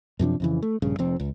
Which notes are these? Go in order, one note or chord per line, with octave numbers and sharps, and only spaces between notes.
F#2 C3 F3 D4
F2 C#3 E3
A3
A#1 G2 C#3
F1 F2 C4
C#2